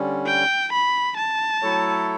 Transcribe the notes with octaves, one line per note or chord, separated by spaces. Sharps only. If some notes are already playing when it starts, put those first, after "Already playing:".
Already playing: D3 G3 C#4
G5
B5
A5
F#3 A3 E4 A4 C#5